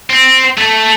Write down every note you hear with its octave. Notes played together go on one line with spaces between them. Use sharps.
C4
A3